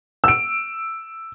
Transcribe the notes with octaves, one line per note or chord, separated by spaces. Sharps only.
E6 D7